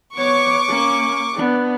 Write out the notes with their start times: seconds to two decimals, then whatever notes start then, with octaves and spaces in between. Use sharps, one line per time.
0.15 B3 C#5 C#6 D6
0.68 A#3 C#4
1.33 B3 D4